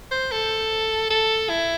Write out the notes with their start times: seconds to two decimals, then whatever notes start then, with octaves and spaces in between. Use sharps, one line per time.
0.11 C5
0.32 A4
1.10 A4
1.49 E4